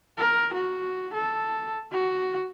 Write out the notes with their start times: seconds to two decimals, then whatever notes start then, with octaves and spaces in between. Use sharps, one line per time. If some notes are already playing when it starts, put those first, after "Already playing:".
0.18 A#4
0.54 F#4
1.14 A4
1.92 F#4